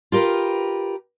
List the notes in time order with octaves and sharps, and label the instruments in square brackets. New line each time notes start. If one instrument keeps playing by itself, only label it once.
[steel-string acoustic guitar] F4 G4 A#4 B4